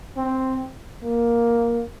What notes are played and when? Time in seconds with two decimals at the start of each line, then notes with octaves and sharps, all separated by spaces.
0.17 C4
1.02 A#3